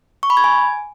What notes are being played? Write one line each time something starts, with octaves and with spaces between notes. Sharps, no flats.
C#6
B5
G#6
G#5